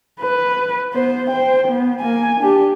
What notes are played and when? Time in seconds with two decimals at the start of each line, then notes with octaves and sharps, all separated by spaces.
0.21 B4
0.94 B3 C5
1.30 C5 G5
1.68 B3
2.00 A#3 G#5
2.40 D4 G4